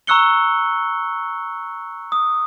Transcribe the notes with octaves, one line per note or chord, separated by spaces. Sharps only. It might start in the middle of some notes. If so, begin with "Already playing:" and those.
A#5 C#6 E6 F#6 C#7 G7
D#6